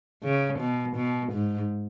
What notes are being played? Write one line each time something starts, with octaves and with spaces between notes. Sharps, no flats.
C#3
B2
B2
G#2